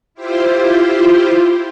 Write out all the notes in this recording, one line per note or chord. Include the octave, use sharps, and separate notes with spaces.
E4 F4 G4 C5